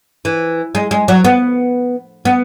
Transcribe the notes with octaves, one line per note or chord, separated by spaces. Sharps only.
E3
G#3
G#3
F#3
B3
B3